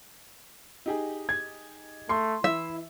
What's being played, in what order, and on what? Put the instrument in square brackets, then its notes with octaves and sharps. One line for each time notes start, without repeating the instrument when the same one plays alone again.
[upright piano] D#4 G4 G#4
[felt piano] G#6
[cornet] A3 [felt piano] C6
[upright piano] E3 [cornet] E4 [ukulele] E5